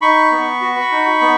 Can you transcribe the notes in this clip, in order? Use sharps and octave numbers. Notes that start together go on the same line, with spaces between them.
D#4 B5 C#6
B3
F#4
D#4
B3